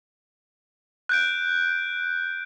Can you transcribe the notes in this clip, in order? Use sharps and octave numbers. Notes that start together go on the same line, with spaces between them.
F#6 G6 D7